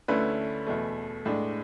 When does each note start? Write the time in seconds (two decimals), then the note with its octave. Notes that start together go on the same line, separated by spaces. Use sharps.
0.08 D2 D3 A3 C#4 E4 B4
0.67 E2 B2 A3
1.26 A2 G#3 D4